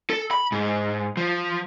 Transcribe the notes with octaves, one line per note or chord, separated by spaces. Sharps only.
A4
B5
G#2
F3